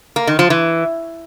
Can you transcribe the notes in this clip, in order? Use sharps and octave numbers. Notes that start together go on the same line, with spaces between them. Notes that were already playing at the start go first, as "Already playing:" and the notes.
A#3
D#3
F3
E3